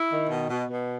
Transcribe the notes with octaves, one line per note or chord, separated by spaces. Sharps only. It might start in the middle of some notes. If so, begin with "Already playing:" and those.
Already playing: E4
D#3
B2
B2
B2